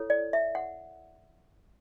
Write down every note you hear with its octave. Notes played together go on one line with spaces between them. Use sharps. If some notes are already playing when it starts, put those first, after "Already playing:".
Already playing: E4 A4 C#5
D5
E5
F#5